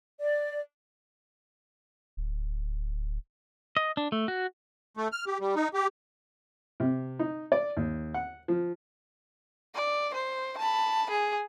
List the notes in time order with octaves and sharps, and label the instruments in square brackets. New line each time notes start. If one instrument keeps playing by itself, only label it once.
[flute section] D5
[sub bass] D1
[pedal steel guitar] D#5
D4
A3
F#4
[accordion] A3
F6
G4
G3
D#4
G4
[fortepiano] C3
D#4
D5
D#2
F#5
F3
[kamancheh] D5
C5
A5 B5
G#4